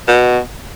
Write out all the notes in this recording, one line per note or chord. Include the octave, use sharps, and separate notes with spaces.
B2